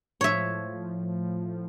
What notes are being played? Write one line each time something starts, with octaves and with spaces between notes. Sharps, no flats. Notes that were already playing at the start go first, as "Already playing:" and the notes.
A2 F3 C#5 E5